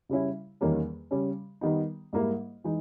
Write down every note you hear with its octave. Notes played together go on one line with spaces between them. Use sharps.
C#3 G3 C#4 E4
E2 D#3 G3 A#3 C#4
C#3 G3 C#4
D#3 G3 B3 D#4
G#2 G3 A#3 E4
E3 G#3 D#4